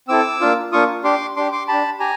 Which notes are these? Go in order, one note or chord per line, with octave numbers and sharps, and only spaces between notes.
C4 E4 A4 D6 E6
A#3 D4 F4
A#3 D4 F4 C#6 D#6
D4 G4 C6 D6
D4 G4 C6 D6
C6 D6
D4 G4 A5 B5
G4 G#5 A#5